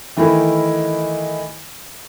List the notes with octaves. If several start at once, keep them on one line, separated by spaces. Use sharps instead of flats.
D#3 E3 A3 D#4 E4 A#4